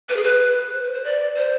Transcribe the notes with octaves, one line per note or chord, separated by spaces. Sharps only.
B4
G#4
B4
C5
B4
C5
D5
C5